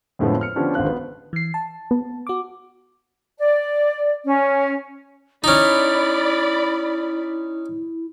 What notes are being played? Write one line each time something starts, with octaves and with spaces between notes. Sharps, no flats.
F2 A2 D3 F3 G#3 B3
F6 C#7
D3 F3 B3 C#4 D4 G4
G#1 D3 C4 F5 F#6
B3
E3 C7
A5
B3
F#4 D6
D5
C#4
C#4 D#4 E4 D5 B5